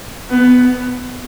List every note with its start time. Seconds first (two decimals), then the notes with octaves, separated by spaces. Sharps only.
0.30 B3